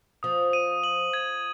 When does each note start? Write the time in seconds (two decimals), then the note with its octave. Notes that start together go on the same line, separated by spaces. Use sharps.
0.23 F3 D#6
0.53 D#7
0.83 F#7
1.14 G#6